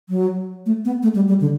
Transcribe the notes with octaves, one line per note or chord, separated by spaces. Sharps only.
F#3
A3
B3
A3
G3
G3
D3